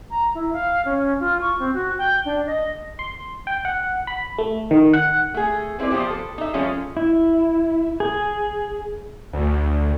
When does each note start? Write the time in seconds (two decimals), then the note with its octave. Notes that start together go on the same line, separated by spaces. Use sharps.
0.11 A#5
0.35 E4
0.53 F5
0.85 C#4
1.20 F4
1.41 C#6
1.59 C4
1.74 F#4
1.98 G5
2.25 D4
2.47 D#5
2.99 C6
3.47 G5
3.65 F#5
4.07 B5
4.38 A3
4.71 D#3
4.93 F#5
5.34 A3 G#4
5.79 B3 C4 E4 B4 D5
5.91 F3 B3 F4 G4 C5
6.10 A4
6.38 D#4 E5
6.54 F3 G#3 C#4 F4 A4
6.97 E4
8.00 G#4
9.33 D2